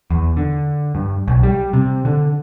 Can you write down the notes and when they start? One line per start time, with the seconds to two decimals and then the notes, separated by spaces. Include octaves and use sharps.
0.11 E2
0.37 D3
0.95 G2
1.28 B1
1.43 G3
1.73 C3
2.05 D3